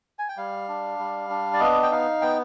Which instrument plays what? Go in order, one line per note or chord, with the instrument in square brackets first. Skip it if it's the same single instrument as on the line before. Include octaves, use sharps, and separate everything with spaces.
[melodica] G#5
G5
G3 F5
D4
G3
D4
D5
B3 D#5
G5
D#4 F5
B3 G5